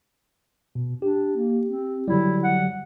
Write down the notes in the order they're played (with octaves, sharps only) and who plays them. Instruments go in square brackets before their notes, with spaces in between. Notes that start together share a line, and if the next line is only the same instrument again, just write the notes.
[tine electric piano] B2
[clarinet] D4 [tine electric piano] G4
[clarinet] A#3
C4
[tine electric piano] D3 F#3 G3 [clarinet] E4
[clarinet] F#5